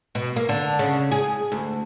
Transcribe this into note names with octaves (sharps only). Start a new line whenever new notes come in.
B2
A#3
D3
C#3
G#4
D2